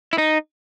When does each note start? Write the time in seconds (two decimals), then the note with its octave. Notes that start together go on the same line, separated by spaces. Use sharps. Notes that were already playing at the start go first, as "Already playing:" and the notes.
0.13 E4
0.18 D#4